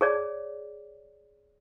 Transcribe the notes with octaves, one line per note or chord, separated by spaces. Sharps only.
G#4 C#5 D5